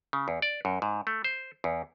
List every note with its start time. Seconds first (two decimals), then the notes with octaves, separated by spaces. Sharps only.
0.13 C#3
0.28 E2
0.42 D5
0.65 F#2
0.82 G#2
1.07 A3
1.24 C5
1.64 E2